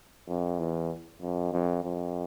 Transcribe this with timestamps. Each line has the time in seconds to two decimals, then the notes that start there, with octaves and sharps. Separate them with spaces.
0.28 F2
0.59 E2
1.22 F2
1.53 F2
1.84 F2